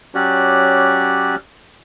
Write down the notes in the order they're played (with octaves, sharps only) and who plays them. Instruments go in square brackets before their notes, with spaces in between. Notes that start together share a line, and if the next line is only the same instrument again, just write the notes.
[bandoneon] F#3 C#4 F#4 G4 D5